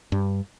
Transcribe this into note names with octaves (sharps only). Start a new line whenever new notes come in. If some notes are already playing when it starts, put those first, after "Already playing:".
G2